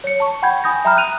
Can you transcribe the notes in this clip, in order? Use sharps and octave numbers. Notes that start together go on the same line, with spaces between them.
C#5 C#7
A5 C#6
F#5 G5 B5 G6 G#6
G#5 B5 D#6 G6 A#6
E5 G5 A#5 B5 D#6 F6
F#6 D#7 F7